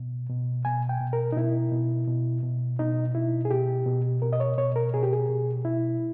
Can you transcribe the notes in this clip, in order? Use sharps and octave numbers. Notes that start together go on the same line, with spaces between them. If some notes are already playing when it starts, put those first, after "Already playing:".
Already playing: B2
B2
B2 G#5
G5
B2
A#4
D#4
B2 E4
B2
B2
B2
B2 D#4
B2 E4
G#4
B2 G4
B2
B2 A#4
D#5
C#5
B2 C#5
A#4
B2 G#4
G4
G#4
B2
B2 E4